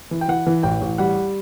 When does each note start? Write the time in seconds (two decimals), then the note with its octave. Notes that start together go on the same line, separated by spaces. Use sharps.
0.11 E3
0.21 G5
0.28 E3 F#5
0.47 E3
0.63 A1 G5
0.81 A1
0.98 G3 F#5